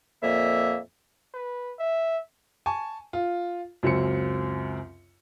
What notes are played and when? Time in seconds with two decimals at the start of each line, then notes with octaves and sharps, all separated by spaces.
0.22 F2 A#2 A#3 E5
1.34 B4
1.79 E5
2.66 G#5 A5 C#6
3.13 F4
3.83 C#2 F#2 C4 C#7